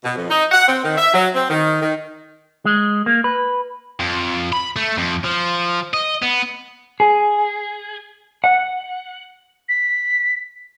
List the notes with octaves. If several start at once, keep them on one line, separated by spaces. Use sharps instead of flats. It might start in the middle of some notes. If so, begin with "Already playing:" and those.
B2
F2
D#4
F#5
C4
D#3
E5
F#3
C4
D#3
D#3
G#3
A#3
B4
F2
B5
A3
F2
F3
D#5
B3
G#4
F#5
B6